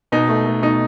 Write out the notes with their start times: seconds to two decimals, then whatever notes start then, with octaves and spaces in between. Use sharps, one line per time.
0.12 B2 D#4
0.29 A3
0.46 A3
0.62 B2 D#4